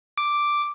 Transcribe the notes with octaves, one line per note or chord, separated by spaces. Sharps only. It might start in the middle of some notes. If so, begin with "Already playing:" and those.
D6